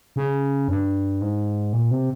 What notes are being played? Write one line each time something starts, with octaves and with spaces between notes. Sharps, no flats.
C#3
G2
G#2
A#2
C3